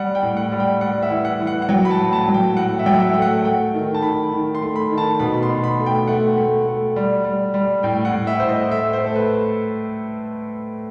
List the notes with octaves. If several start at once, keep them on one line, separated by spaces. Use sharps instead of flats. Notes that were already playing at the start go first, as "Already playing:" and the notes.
Already playing: G3 F#5
G5
A2
F#5
G3
G5
G3 F#5
E5
E3
F#5
E3
F#5
F#5
F#3 G5
B5
A5
A2
A5
F#3
G5
A2 F#5
E5
F#3 G5
F#5
E5
A3 G5
F#5
A3 G5
D#3
A5
D#3 B5
D#3
C6
A3
B5
D#3
A5
B2 B5
B5
C6
B2
B5
A3
G5
A3 F#5
A3
A3
G3
G3
G3
A2 G5
F#5
A2
E5
A2 C5
D#5
A3 E5
C5
A3
A4
B4